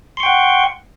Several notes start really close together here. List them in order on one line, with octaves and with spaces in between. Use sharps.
C6 C#6 G5 F#5